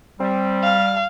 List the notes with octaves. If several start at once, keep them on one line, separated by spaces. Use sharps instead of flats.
G3 C4
F5